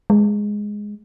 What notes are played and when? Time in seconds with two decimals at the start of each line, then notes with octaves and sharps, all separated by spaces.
0.10 G#3